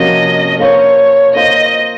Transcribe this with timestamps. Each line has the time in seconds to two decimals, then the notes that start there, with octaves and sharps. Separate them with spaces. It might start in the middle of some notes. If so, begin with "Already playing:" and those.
Already playing: C3 F3 A#3 C#4 F#4 D#5
0.59 A#3 F4 C5 C#5
1.34 A#3 F4 C5 D#5